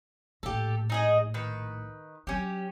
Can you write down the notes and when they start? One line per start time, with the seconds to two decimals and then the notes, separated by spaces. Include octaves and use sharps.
0.43 A#1 A2 G4 A4
0.90 D#4 G#4 D#5
1.34 D#3 B4
2.27 F#3 C#4 G4